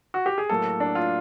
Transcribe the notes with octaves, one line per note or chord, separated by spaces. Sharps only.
F#4
G4
G#4
A2 F#3 A#3 A4
D4
F4